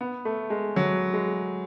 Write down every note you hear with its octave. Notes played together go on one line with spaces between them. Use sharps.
B3
A3
G#3
F#3
G#3